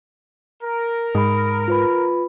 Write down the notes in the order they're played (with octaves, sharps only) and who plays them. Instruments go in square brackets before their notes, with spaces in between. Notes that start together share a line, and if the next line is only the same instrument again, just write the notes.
[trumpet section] A#4
[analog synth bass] G#2 [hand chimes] B5 D#6
[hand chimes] F4 B4 B5